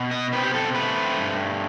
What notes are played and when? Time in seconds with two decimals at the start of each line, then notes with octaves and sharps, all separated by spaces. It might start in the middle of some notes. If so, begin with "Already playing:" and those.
Already playing: B2
0.11 D#5
0.33 C4 B4
0.44 G4
0.54 A4
0.75 A3 B4
1.18 G2